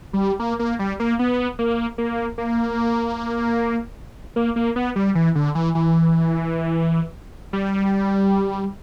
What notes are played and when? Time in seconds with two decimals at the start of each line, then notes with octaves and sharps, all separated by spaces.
0.13 G3
0.39 A#3
0.59 A#3
0.79 G3
1.00 A#3
1.19 B3
1.59 A#3
1.98 A#3
2.38 A#3
4.36 A#3
4.56 A#3
4.76 B3
4.96 G3
5.15 E3
5.35 D3
5.55 E3
5.75 E3
7.53 G3